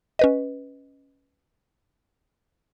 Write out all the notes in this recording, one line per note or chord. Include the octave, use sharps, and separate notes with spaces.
C#4 B4 D#5